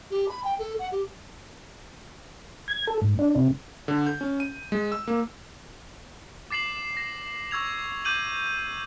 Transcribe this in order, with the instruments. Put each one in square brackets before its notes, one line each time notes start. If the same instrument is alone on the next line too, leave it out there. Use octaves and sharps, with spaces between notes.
[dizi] G4
B5
G5
A4
F#5
G4
[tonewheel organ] G#6
A4
G#2
D4
C3
[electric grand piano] D3
G6
C#4
D#7
G#3
E6
A#3
[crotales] D6 A6 C7 E7 F#7
A#6
C#6 E6 G#6 F7
D6 G6 D#7 F#7